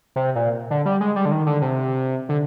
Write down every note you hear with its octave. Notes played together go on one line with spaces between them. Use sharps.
C3
A#2
D3
G3
G#3
G3
D3
D#3
D3
C3
D3